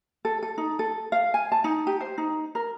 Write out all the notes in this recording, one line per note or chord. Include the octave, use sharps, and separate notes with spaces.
A4
A4
D#4
A4
F5
G#5
A5
D#4
G4
C5
D#4
A#4